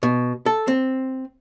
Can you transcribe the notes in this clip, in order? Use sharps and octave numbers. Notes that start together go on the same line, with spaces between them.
B2
A4
C4